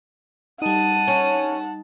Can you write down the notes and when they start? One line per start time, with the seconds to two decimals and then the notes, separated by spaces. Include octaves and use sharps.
0.62 G3 D#4 F#5 A5 D#7
1.08 C#4